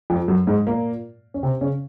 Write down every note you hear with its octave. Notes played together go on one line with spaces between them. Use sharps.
F2 F3
F#2 F#3
G#2 G#3
A#2 A#3
C#4
C3 C4
C#3 C#4